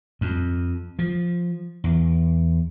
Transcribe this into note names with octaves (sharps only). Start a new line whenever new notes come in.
F2
F3
E2